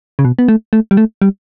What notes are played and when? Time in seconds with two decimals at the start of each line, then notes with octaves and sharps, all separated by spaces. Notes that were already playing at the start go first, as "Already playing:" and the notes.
0.19 C#3
0.25 B2
0.39 B3
0.48 A3
0.73 A3
0.91 G3
0.97 A3
1.22 G3